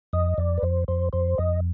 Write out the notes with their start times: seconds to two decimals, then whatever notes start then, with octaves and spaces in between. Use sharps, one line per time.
0.13 F2 D#5
0.38 F2 D5
0.58 B4
0.63 F2 C5
0.88 F2 C5
1.13 F2 C5
1.38 F2 D#5